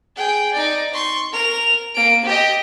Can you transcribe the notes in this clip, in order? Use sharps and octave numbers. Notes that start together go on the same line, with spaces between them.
G#4 G5
D#4 D5
C6 C#6
A#4 F7
A#3 D7
G4 D#5